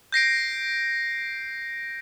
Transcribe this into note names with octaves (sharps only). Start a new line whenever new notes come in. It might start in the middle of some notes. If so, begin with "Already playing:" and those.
G6 A#6 C7 D7